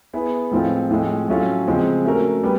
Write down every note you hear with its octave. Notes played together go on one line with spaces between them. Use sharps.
B3 E4 G#4 B4
A2 F3 G#3 C4 F4
A2 F3 G#3 C4
A2 F#3 A3 C#4 F4
C#3 F3 G#3 C4
A3 C#4 F#4 A#4
G3 B3